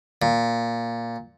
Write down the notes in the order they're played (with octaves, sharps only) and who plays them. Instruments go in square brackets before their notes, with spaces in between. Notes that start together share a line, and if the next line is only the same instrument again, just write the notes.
[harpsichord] A#2